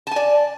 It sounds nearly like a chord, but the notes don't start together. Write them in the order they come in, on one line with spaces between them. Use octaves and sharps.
A5 G#5 D5